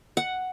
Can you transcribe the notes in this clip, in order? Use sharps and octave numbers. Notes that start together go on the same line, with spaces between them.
F#5